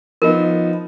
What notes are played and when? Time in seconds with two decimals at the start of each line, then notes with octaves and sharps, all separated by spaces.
0.22 F3 B3 D#4 A#4